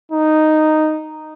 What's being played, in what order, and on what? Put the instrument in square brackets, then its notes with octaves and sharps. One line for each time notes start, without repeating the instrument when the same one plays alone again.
[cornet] D#4